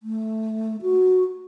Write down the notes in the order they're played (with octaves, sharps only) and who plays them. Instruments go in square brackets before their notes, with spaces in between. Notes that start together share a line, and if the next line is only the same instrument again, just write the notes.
[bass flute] A3
F#4